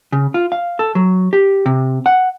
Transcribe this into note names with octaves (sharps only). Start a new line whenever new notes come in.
C#3
F4
F5
A4
F#3
G4
C3
F#5